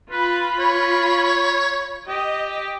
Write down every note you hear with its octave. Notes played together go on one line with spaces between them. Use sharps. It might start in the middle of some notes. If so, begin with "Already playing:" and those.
F4 B4 B5
C#5
G4 D#5